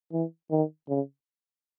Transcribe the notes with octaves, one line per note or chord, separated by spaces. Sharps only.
E3
D#3
C#3